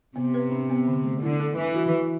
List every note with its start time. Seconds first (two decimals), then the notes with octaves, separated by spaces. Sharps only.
0.16 C3 B3
0.34 B4
0.51 D4
0.70 B3
0.87 D3
1.04 A3
1.22 D3 E4
1.40 A4
1.58 E3 D4
1.75 F#4
1.93 E3